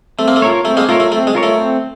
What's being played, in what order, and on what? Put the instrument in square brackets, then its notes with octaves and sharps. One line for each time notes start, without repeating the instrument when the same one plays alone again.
[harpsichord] A3 [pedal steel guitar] C4
[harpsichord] A#3
A3
[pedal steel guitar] F4 A#4 C#5
[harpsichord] A3 [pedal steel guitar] C4
[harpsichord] G#3 A#3
[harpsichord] A3 [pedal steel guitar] F4 A#4 C#5
[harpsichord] A3
[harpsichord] A3 [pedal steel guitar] C4
[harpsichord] G#3
[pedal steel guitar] F4 A#4 C#5
[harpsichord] A3
[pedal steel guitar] C4